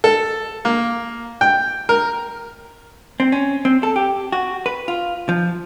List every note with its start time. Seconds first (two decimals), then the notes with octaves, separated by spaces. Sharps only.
0.04 A4
0.65 A#3
1.41 G5
1.89 A#4
3.20 C4
3.32 C#4
3.65 C4
3.83 A4
3.96 G4
4.32 F#4
4.66 B4
4.88 F4
5.29 F3